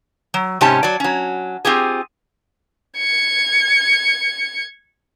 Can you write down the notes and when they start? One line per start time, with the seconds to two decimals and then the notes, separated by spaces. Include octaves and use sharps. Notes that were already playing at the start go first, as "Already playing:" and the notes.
0.34 F#3
0.61 G#2 C3 C#4 G4 G#5 A5
0.83 F#3 D5
1.00 F#3 C#4
1.65 C4 F4 G4 G#4
2.98 G#6 C#7